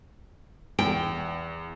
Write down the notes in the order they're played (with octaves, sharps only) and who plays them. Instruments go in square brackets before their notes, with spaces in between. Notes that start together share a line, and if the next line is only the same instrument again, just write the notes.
[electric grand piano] E2 [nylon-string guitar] G5